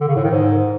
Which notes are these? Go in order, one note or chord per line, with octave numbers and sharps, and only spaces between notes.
D3
C#3
A2
D#3
G#2